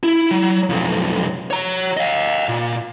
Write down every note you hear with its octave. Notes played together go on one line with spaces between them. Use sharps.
E4
F#3
B1 F2
C#5 A#5
D#5 F5
A#2